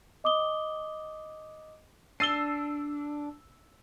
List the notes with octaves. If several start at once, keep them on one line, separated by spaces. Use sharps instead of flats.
D#5 D6 D#6 G7
D4 E6 A6 C7 D#7 G7